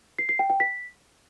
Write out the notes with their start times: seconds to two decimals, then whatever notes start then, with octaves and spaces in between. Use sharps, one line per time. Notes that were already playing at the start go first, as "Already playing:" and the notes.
0.19 C7
0.29 C7
0.39 G5
0.50 G5
0.60 B6